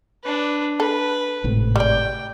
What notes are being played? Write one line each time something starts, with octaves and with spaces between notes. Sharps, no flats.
D4 B4
A4 B4
G#1 A2 C3
G3 D5 G5